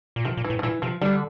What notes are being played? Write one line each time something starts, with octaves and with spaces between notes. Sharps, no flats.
A#2
C3 F3
A#2
E3
A2
F3
A#2 E3
C3 F3
D3 G3